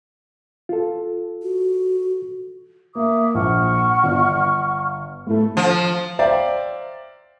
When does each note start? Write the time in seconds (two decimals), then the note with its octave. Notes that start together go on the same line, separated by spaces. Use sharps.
0.69 F4 A4
1.43 F#4
2.95 A#3 E5 D6 D#6
3.34 A#1 F#5 C#6 F6
4.04 G1 D5
5.27 A2 A3 A4 B5
5.57 F3
6.19 C5 D5 E5 F5 G5 A#5